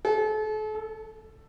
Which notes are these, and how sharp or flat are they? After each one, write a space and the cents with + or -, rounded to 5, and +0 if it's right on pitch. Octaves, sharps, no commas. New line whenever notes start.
A4 -40
A4 +5